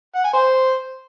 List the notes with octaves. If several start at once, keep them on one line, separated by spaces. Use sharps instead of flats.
F#5
G#5
C5